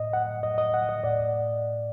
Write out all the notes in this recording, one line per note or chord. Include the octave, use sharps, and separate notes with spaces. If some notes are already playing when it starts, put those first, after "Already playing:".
Already playing: A2 D#5
F#5
D#5
D#5
F#5
D#5
A2 D5